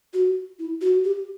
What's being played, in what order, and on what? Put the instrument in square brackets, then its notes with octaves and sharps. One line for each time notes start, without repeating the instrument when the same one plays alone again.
[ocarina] F#4
E4
F#4
G4